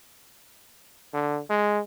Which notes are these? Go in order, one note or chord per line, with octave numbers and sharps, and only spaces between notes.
D3
G#3